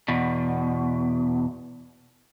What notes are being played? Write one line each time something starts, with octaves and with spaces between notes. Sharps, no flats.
E2 B2